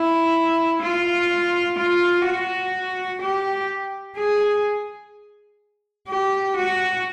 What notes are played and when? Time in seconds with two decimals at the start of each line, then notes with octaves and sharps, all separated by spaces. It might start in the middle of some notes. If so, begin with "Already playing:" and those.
Already playing: E4
0.82 F4
1.78 F4
2.25 F#4
3.21 G4
4.17 G#4
6.08 G4
6.57 F#4